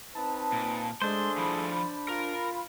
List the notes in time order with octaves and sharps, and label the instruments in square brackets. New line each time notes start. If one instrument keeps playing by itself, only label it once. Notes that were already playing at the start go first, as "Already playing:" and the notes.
[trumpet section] C4 D#4 B4 [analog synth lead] A5
[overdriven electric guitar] A#2
[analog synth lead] G#3 [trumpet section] A3 G#4 A4 [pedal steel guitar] D4 C5 [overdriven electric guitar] C6
[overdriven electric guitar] F3 E4 [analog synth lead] B5
[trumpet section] F4 [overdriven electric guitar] A#4